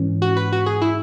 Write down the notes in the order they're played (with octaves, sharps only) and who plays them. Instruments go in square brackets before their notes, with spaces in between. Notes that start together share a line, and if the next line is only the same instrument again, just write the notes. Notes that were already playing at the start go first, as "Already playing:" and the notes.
Already playing: [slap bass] G#2 E3 C#4
[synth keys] F#4
B4
F#4
G#4
E4